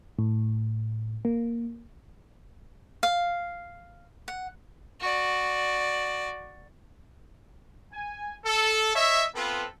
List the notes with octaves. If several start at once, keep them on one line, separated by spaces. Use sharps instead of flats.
A2
A#3
F5
F#5
F#4 D5
G#5
A4
C#5 D#5 E5
B3 C4 F4 A4 B4